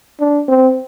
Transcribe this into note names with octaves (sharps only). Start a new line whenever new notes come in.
D4
C4